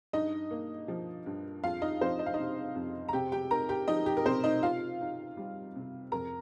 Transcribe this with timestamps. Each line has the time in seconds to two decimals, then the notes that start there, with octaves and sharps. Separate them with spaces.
0.13 G2 D#4 D#5
0.51 A#3
0.88 F3
1.26 G2
1.63 F2 F4 F5
1.82 D#4 D#5
2.01 F3 C4 C5
2.19 D#5
2.26 F5
2.34 C3 D#4 D#5
2.75 F2
3.09 A#5
3.13 C3 G4 G5
3.32 G4 G5
3.50 D#4 A#4 A#5
3.69 G4 G5
3.88 F3 D#4 D#5
4.06 G4
4.17 A#4
4.25 C3 C4 C5
4.44 D#4 D#5
4.63 C3 F4 F5
5.01 D#4
5.37 G3
5.76 C3
6.12 F2 A#4 A#5